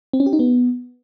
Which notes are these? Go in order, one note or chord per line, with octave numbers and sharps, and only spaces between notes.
C4
C#4
G4
D#4
B3